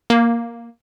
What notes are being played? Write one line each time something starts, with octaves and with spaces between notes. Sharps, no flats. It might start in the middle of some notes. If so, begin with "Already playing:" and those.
A#3